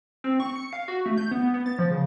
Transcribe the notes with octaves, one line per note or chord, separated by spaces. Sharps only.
C4
C#6
C#7
F5
F#4
A3
G6
B3
B3
A6
F3
C#3